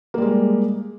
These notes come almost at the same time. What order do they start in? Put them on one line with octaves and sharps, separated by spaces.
A#3 G3 G#3